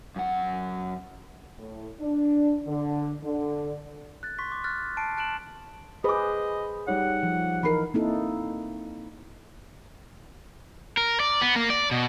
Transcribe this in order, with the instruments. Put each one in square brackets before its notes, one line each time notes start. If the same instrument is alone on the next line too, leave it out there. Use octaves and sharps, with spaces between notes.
[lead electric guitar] F#2 F#5
[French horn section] A2
D4
D3
D3
[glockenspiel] F#6 A6
C6 C#6 B6
D6
F6 F#6 A6
A5 C7 D7
A5 F#6 D7 E7 F#7
[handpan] G#4 B4 C5 [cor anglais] D#5 [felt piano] B5 D6
[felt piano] G3 D#4 C#5 [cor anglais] F#5
[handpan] F3
[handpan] E3 D#4 A#4 [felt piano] B5 C7
[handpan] A#3 C4 D#4 E4 A4
[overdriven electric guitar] A#4
D5
B3
A#3
D5
B2